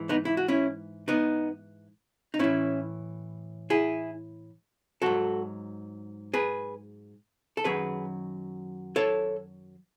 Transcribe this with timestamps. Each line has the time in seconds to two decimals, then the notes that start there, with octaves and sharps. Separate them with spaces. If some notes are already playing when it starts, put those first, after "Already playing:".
Already playing: G#2 E3
0.09 B3 D#4
0.25 E4
0.37 F#4
0.48 C#4 E4
1.08 B3 D#4
2.34 D#4
2.39 A2 E3 C#4 E4
3.70 E4 G#4
5.02 G#2 F#3 F#4 A4
6.34 G#4 B4
7.57 A4
7.64 F#2 D#3 F#3 G#4 B4
8.96 A4 C#5